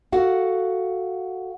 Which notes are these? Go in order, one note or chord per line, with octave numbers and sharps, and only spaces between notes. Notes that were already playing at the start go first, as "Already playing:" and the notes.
F#4 A4 F5 F#5